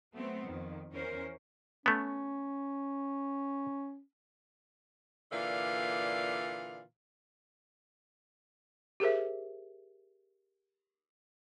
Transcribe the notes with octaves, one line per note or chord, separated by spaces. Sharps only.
F#3 A3 B3 C4
F2 D#3
E2 C#4 A#4 C5
A3 B3 C#4
A#2 D3 E3 D5 F5
G4 G#4 A#4 C5 E5